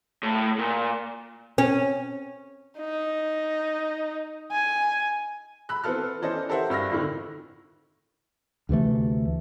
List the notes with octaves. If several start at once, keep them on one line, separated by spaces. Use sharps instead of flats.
A2
A#2
C#4
D#4
G#5
B5 E6 F#6
E3 B3 C4 A4 F6
E3 C#4 A4 C5 D5 D#5
G4 A4 A#4 C5 E5 F#5
G2 E6 F6 A#6
F2 A2 D3 D#3
D2 C3 E3 A3